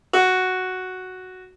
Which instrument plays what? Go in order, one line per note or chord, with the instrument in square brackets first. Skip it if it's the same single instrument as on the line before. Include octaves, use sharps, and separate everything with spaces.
[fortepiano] F#4